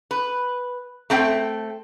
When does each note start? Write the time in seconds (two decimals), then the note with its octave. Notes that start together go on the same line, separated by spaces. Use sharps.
0.11 B4
1.10 A3 C4 A4 F#5 G5